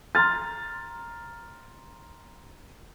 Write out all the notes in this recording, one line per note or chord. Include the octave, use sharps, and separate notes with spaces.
A#5 C6 F6 A6